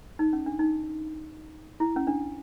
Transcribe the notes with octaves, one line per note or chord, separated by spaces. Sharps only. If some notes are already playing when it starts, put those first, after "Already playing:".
D#4
C#4
D4
D#4
E4
C#4
D4